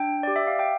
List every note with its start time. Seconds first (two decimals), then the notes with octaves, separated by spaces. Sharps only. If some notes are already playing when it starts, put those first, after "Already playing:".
Already playing: D4 G5
0.23 G4 D5
0.36 E5
0.47 F5
0.59 G5